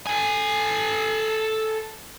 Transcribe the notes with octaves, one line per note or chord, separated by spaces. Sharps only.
A4 G#5